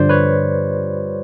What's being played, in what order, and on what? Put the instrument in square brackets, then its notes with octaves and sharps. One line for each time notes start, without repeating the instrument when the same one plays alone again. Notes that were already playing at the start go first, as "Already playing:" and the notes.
Already playing: [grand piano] G2 D3 F3 [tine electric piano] C5 D5
[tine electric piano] B4 C#5